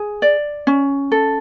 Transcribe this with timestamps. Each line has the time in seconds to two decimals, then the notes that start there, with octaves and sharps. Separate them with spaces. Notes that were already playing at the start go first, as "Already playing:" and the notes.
Already playing: G#4
0.22 D5
0.67 C#4
1.12 A4